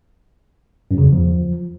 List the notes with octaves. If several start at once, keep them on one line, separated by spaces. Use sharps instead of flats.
F#2
C#3
E2
F3